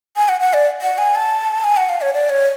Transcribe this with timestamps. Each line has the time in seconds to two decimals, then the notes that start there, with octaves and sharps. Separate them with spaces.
0.16 G#5
0.29 F#5
0.40 F#5
0.53 D5
0.82 F#5
0.98 G#5
1.15 A5
1.64 G#5
1.77 F#5
1.89 F5
2.01 C#5
2.14 D5
2.29 C#5